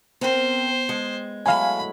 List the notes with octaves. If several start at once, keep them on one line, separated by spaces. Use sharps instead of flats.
B3 C4 A#4 C5 G5
G#3
F#3 A3 E4 F5 G#5 B5